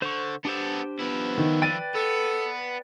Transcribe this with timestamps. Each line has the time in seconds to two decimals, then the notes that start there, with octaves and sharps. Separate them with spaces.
0.02 D3 C5 C#6
0.45 B3 D4 G4 A4 C5
0.99 F3 B3 E4
1.38 D#3
1.62 B4 D5 G5 A6 D#7
1.95 B3 A4